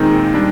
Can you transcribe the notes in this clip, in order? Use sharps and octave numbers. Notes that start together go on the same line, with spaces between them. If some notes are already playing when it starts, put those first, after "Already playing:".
Already playing: A#2 D#3 G#3 C4 D#4
G3 D4